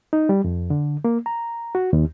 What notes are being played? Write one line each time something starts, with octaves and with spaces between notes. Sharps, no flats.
D#4
G3
F2
D3
A#3
A#5
F#4
D#2